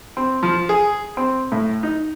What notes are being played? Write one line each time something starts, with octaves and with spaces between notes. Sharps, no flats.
C4
F3
G#4
C4
A2
D#4